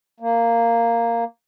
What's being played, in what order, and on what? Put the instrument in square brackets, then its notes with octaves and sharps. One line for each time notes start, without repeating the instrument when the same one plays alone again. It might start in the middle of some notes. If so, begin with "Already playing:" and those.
[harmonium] A#3